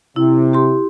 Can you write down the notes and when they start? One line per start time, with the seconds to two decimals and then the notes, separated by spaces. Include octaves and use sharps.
0.16 C3 E4
0.53 G4 C6